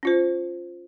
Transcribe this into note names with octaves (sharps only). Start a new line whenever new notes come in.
C#4 F4 C5